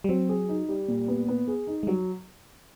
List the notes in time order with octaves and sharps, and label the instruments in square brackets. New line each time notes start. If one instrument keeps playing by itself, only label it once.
[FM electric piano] G3
[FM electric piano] F#3 [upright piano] C4
[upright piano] G#4
D#4
G3
A#2
B3
B3
G#4
D#4
[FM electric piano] G#3
[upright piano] F#3 [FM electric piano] G3